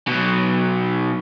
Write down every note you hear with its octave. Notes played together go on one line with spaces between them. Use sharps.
B2 F#3